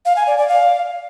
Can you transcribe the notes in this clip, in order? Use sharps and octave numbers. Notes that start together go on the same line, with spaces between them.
F5
G#5
D5
D5
F5